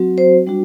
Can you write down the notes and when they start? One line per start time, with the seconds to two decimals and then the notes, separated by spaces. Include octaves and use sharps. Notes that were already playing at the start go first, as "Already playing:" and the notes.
Already playing: F#3 C4 F#4
0.18 C5
0.47 G3 D4 F#4